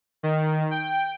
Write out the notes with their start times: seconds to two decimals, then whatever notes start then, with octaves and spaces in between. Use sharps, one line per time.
0.23 D#3
0.71 G5